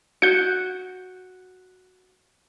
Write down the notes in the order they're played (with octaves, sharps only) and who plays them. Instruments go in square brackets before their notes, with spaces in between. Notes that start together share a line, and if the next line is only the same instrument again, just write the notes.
[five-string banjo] F#4 [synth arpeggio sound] G6 C#7